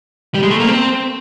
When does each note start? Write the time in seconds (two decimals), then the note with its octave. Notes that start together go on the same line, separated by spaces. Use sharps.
0.34 G3
0.43 G#3
0.50 A3
0.60 A#3
0.67 C4